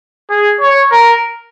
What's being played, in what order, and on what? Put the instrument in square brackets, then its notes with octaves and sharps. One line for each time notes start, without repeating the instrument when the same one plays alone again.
[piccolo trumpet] G#4
C#5
A#4